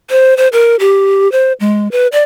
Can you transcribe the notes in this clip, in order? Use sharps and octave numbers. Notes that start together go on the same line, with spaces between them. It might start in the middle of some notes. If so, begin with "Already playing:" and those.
C5
C5
A#4
G4
C5
G#3
B4
D5